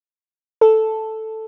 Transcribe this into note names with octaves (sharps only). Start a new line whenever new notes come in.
A4